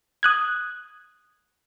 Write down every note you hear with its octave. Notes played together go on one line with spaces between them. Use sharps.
D#6 F#6 G#6